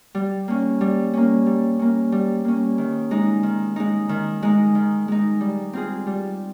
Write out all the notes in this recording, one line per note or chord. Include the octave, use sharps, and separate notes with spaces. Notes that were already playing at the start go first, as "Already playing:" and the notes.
G3
A#3 C#4
G3
A#3 C#4
G3
A#3 C#4
G3
A#3 C#4
D#3
G#3 D#4
D#3
G#3 D#4
D#3
G#3 D#4
D#3
G#3 D#4
G3
C4 F4 G#4
G3